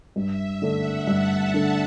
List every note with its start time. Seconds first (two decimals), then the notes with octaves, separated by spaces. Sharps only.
0.15 G2 E5
0.46 E5
0.62 D3 A3 D4
0.77 F#5
1.07 G2 A5
1.54 D3 A3 D4